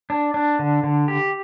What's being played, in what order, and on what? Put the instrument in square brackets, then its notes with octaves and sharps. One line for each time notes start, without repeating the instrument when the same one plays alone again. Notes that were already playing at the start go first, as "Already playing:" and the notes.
[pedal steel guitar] D4
D4
D3
D3
G4